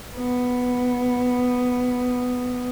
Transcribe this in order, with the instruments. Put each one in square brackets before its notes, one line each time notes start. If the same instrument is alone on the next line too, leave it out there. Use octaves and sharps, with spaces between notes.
[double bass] B3